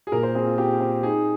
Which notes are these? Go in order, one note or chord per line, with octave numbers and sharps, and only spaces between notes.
G#4
A#2 A#4
C5
C4 G#4
F4
C4 G4
C4
D#4 G#4